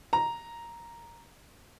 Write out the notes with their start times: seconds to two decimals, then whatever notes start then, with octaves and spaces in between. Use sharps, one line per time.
0.13 A#5